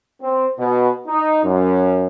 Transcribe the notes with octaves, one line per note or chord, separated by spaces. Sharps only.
C4
B2
D#4
F#2